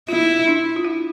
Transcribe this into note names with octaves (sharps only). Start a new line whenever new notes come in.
E4 F4
D4
F4
E4